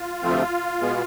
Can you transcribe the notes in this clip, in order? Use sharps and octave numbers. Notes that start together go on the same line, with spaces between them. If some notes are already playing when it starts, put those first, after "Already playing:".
Already playing: F4
D2 C3 F3 A3 C4
B2 G#3 B3